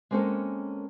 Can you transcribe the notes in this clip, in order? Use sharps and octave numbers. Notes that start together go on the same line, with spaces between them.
G#3 A#3 C4 C#4 A4 A#4